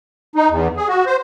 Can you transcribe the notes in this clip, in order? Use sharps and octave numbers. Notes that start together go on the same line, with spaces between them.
D#4
E2
G#4
F#4
C5